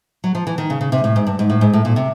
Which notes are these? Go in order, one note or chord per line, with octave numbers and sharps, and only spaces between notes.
F#3
F3
E3
D#3
C#3
C#3
C3
A2
G#2
G2
G#2
A2
G#2
A2
A#2
C3